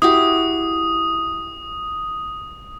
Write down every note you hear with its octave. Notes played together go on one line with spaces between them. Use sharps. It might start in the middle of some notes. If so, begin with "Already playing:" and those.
E4 F#4 G4 D#6